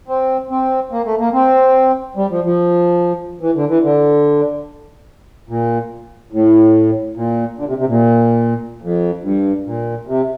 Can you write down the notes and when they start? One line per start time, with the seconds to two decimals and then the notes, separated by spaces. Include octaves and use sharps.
0.08 C4
0.51 C4
0.92 A#3
1.06 A3
1.19 A#3
1.33 C4
2.17 G3
2.30 F3
2.45 F3
3.41 E3
3.55 D3
3.69 E3
3.83 D3
5.49 A#2
6.32 A2
7.15 A#2
7.57 D3
7.68 C3
7.78 C3
7.88 A#2
8.82 F2
9.23 G2
9.65 A#2
10.07 C3